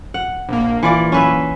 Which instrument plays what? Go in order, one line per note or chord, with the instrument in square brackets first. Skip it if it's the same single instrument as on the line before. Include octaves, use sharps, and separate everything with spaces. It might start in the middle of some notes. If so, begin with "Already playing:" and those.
[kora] F#5
[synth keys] A#1 A#3
[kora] E3 F4 D5
C#4 B4 E5